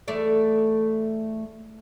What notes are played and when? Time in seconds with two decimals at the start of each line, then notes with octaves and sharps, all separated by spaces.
0.08 E2 A3 D5